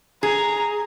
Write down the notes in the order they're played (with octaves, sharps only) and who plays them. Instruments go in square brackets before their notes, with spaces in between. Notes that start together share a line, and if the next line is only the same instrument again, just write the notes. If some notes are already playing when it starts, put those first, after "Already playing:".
[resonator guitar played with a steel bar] G#4 [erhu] A#5